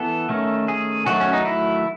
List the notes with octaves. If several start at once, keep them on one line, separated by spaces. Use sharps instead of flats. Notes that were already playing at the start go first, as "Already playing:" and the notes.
Already playing: E3 B3 A4
D#3 A3 C#4
G#4
D#3 F#3 A3 F#4
C#4
D#4
E4